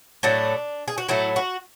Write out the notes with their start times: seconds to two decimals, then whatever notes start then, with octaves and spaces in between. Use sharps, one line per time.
0.23 A2 F#3 A3 D4
0.88 G#4
0.98 F#4
1.08 A2 F#3 A3 E4
1.36 F#4